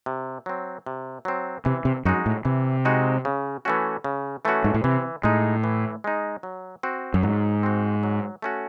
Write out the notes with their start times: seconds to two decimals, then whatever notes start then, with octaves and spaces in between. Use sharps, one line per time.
0.06 C3
0.46 F#3 C4
0.86 C3
1.25 F#3 C4
1.65 C3 E3
1.85 C3
2.05 F#2 G#3 D#4 F#4
2.26 A2
2.45 C3 E3
2.85 G#3 D#4 F#4
3.25 C#3
3.65 E3 A3 C#4 F#4
4.04 C#3
4.45 E3 A3 C#4 F#4
4.64 G#2
4.74 A2
4.84 C3 E3
5.23 A2 G#3 D#4
5.64 E3
6.04 G#3 D#4
6.43 F#3
6.83 C4 F#4
7.14 F#2
7.23 G#2 F#3
7.63 C4 F#4
8.03 F#3
8.42 A3 C#4 F#4